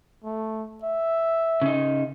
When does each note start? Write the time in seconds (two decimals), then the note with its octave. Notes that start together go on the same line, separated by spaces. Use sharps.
0.24 A3
0.84 E5
1.62 C#3 D#4